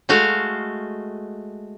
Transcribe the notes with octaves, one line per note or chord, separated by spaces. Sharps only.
G#3 A3 F#4 F5